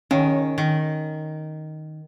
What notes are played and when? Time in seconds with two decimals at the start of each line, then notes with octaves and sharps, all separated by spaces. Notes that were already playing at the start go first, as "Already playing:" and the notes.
0.11 D#3 C#4
0.58 D#3